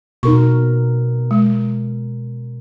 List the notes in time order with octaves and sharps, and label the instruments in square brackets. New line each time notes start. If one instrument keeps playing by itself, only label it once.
[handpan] B2 A#4 [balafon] D#4 C#6
[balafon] G#3